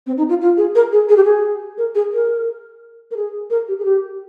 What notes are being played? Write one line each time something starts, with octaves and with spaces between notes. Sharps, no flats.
C4
D#4
F4
F4
G#4
A#4
G#4
G#4
G4
G#4
A#4
G#4
A#4
A#4
G#4
A#4
G4
G#4
G4